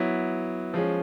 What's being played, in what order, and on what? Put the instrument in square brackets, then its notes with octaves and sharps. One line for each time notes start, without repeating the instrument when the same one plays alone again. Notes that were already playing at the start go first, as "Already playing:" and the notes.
Already playing: [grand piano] F#3 B3 E4
F3 G#3 C#4